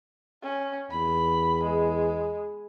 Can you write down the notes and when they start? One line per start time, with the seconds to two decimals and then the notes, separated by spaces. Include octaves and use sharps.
0.43 C#4
0.91 E2 B5
1.64 G#3